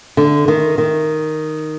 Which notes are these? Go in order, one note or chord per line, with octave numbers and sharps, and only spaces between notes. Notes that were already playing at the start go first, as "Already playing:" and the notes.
D3
D#3
D#3